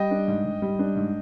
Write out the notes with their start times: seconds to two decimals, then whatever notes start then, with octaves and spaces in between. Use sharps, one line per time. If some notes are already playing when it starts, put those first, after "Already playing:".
Already playing: G3 D#5 G5
0.11 D4
0.28 G#2
0.45 G#2
0.62 G3
0.79 D4
0.96 G#2